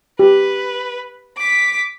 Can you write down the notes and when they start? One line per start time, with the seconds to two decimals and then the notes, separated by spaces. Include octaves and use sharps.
0.19 G4 B4
1.37 D6 B6